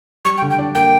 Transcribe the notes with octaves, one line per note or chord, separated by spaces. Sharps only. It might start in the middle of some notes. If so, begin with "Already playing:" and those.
G3 C#6
G5
D3
G5
D4
A#3 G5